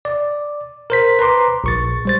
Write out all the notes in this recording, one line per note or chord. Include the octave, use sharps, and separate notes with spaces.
D5
A#4 C5 B6
B4 A#5 C6 D6
A#1 C#6 A6
G3 C5 A6